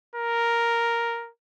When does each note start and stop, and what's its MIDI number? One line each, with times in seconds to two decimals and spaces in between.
0.15 1.30 70